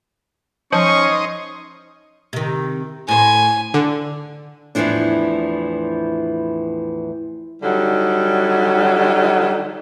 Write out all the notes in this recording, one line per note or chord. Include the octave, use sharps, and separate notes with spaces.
F3 C#4 D#4 C5 D#5 C#6
C3 D#3
A2 C5 G#5
D3
E2 A2 C3 E3 F3 D4
D3 F#3 G3 D#4